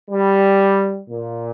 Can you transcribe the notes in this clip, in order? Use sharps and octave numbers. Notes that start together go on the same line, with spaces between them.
G3
A#2